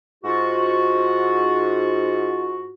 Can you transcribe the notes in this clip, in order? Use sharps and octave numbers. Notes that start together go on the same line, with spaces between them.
G#2 F4 F#4